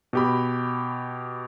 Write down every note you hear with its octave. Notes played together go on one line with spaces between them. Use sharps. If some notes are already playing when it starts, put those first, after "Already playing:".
B2 G4 B5